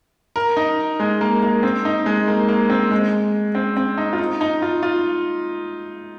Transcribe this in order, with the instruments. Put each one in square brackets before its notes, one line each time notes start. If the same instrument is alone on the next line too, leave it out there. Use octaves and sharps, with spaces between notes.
[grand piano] A#4
D#4
G#3
A#3
A#3
C4
D#4
G#3
A#3
A#3
C4
G#3
C4
C4
D#4
F4
D#4
D#4
F4
F4